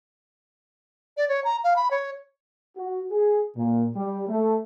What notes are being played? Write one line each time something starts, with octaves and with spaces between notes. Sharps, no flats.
D5
C#5
A#5
F5
B5
C#5
F#4
G#4
A#2
G3
A3